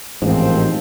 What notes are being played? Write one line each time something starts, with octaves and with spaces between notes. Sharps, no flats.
A1 D#2 G#2 F3 C4